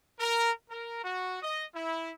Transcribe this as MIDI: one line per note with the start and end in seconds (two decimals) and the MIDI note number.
0.19 0.50 70
0.70 1.00 70
1.03 1.39 66
1.42 1.64 75
1.74 2.10 64